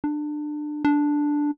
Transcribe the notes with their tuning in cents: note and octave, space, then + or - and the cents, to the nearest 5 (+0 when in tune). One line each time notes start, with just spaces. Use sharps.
D4 +25
D4 +0